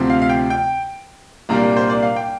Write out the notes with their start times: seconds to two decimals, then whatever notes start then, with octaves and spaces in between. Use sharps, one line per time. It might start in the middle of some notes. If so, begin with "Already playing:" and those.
Already playing: D2 C3 F3 C4
0.10 F5
0.22 F5
0.29 G5
0.50 G5
1.49 C2 A#2 G3 A#3 D4 A#5
1.77 C5
1.90 D5
2.03 F5
2.16 G5